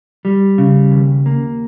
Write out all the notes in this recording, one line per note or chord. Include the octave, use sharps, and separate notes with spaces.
G3
C#3
D#2
A#3